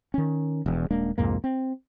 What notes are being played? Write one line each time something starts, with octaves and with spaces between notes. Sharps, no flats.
D#3 C#4
E1 E2
D#1 G#3 A#3 D4
C2 F2 G#2 A#3
C4